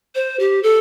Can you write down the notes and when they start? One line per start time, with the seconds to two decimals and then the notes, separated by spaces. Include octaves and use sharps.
0.15 C5
0.40 G4
0.63 A4